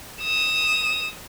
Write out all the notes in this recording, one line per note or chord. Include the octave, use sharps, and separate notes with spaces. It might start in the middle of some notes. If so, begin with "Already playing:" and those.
D#6 E7